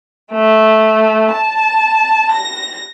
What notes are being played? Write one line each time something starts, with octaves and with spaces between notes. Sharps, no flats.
A3
A5
A#6